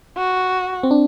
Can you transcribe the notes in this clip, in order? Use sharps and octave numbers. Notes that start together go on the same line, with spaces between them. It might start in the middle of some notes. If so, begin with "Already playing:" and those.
F#4
C4
D4